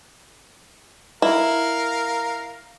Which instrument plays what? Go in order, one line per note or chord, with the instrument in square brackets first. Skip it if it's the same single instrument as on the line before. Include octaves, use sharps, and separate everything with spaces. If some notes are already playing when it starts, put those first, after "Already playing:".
[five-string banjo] E4 [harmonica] A#4 F5